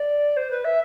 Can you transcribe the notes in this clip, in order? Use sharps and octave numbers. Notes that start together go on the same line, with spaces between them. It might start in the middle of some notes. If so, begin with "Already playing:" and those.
Already playing: D5
C5
B4
E5